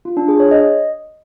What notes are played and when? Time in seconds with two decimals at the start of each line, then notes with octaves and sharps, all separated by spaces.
0.05 F4
0.17 D4
0.28 G#4
0.40 C#5
0.51 D#5